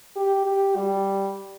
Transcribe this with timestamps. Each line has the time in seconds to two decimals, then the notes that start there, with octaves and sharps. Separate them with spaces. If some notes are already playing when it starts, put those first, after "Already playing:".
0.16 G4
0.46 G4
0.76 G3